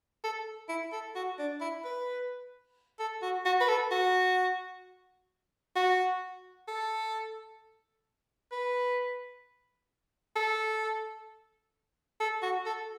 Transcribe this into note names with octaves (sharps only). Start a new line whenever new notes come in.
A4
E4
A4
F#4
D4
E4
B4
A4
F#4
F#4
B4
A4
F#4
F#4
A4
B4
A4
A4
F#4
A4